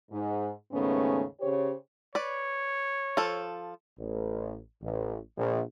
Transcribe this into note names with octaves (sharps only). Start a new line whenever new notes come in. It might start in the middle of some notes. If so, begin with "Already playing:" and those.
G#2
D#2 G#2 C#3 A3 B3 C#4
C#3 G4 C5 C#5
B4 C#5 D5
F3 A4
A1
A1
A#1